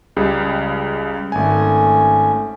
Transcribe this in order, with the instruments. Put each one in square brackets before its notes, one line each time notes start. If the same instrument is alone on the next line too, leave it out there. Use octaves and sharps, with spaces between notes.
[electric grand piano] C#2 C#3 G3
[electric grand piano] G#1 G#5 [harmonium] A3 C#4